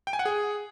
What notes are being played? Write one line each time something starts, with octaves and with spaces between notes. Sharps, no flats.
G5
G#5
F#5
G#4